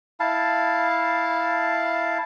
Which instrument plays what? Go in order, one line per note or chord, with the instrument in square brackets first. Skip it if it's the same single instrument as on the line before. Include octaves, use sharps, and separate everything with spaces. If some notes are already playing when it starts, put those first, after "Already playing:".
[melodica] E4 F5 A5